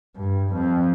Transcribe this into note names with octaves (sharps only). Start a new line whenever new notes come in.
G2
F2